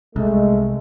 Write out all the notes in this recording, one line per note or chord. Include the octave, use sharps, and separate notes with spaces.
C2 G#3 A3